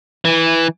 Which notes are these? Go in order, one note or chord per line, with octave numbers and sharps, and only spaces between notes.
E3